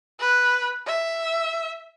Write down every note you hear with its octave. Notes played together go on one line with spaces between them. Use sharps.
B4
E5